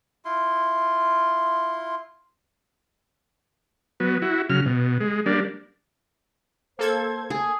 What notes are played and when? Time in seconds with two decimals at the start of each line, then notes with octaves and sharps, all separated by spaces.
0.25 E4 F4 C6
4.00 F#3 B3
4.22 E4 F#4
4.50 C#3 F#3 F6
4.66 B2
5.00 G#3
5.26 G3 A#3 D4
6.79 A#3 A4 C5 G#6
7.30 G#4 G#5